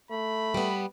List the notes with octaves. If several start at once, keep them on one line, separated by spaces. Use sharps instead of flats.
A3 B5
G3 B3